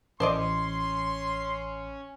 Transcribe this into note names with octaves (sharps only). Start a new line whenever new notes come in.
A1 C#4 C5 D5 D#5 C6